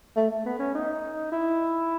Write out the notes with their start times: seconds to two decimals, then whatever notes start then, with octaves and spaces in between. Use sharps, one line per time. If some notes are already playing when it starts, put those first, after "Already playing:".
0.16 A3
0.31 A3
0.45 B3
0.59 C#4
0.75 D#4
1.32 E4